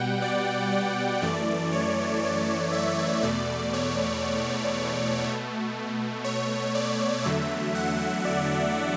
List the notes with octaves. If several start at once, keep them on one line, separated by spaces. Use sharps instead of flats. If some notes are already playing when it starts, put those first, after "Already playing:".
Already playing: B2 G3 F#5 G5
D5
D5
F#2 E3 A3 D5
C#5
D5
E5
E2 B2 A3 D5
C#5
B2 A3
C#5
D5
E2 D3 F#3 A3 E5
F#5
D5